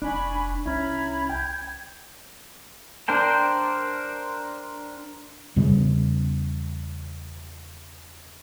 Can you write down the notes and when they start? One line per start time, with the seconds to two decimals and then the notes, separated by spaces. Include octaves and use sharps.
0.02 F1 D4 G#5 B5 C#6
0.66 C2 C#4 E4 A#5 B5 G#6
1.29 G5 G6 G#6
3.08 D4 A#4 C5 G5 A5
5.56 E2 C#3 G3 B3